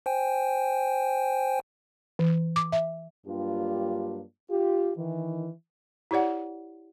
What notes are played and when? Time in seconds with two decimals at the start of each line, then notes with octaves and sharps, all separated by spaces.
0.06 C5 G5 G#5
2.19 E3
2.56 D6
2.72 E5
3.26 G2 F#3 A#3 D4 F4 G4
4.50 F4 G4
4.96 D#3 E3
6.11 E4 G4 C#5 D5 F#5